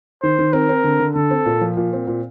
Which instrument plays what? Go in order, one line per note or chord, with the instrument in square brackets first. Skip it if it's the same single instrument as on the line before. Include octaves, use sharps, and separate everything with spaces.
[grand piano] D#3 [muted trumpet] C5
[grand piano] D#3
[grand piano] C4 [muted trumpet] A#4
[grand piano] C4
D3
D3
[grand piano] D3 [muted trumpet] A4
[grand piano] C4
A#2
F3
A#2
C4
A#2